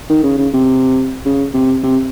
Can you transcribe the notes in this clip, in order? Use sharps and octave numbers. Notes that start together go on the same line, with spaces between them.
D#3
C#3
C#3
C3
C#3
C3
C3